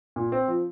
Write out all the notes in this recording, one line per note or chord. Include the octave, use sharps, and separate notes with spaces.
A#2
C4
F3